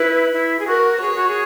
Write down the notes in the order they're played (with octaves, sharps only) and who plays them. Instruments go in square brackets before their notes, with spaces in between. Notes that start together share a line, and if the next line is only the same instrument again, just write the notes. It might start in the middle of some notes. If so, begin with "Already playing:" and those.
Already playing: [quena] E4 [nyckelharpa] B4
[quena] E4
G#4
[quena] F#4 [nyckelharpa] A#4
[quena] G#4 [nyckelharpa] C#5
[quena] F#4
G#4